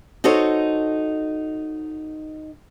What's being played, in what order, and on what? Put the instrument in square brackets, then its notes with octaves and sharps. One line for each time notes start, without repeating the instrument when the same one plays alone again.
[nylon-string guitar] D#4 F#4 A4 C5 C#5